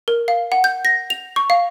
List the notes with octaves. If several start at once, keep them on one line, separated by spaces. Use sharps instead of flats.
A#4
F5
F#5
G6
A#6
F7
C#6
F5